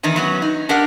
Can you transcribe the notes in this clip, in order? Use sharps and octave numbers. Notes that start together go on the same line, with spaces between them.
E2 D#3 E3 D#4 E4
F#3 B3 C#4
D#4
D4 G4 A#4 D#5 F#5